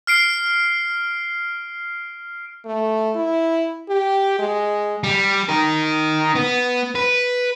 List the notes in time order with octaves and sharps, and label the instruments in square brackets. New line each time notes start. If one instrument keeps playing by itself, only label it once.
[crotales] F6 C7 D7
[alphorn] A3
E4
G4
G#3
[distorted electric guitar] G3
D#4 A#4
B3
B4